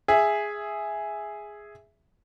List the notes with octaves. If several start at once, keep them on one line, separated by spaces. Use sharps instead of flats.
G#4 E5